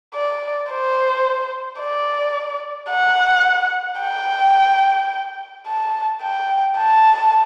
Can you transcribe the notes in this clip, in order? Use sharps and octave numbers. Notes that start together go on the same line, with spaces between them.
D5
C5
D5
F#5
G5
A5
G5
A5